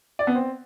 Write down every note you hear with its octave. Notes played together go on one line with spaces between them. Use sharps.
D5
B3
C4